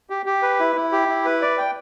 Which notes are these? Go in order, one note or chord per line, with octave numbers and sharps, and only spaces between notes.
G4
G4
B4
E4
E4
G4
E4
B4
D5
G5